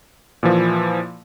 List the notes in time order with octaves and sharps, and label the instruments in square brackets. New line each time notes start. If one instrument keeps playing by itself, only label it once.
[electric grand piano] A#2 E3 F3